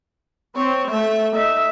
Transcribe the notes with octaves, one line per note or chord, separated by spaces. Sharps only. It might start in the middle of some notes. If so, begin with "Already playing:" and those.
C4 C#5
A3 E5
D#4 E5